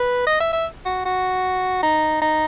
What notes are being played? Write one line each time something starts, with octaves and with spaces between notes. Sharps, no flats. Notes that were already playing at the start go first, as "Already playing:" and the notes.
Already playing: B4
D#5
E5
E5
F#4
F#4
D#4
D#4